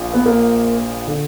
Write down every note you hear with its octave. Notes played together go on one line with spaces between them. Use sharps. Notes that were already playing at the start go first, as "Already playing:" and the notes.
Already playing: A#1 A#2
B3
A#3
D3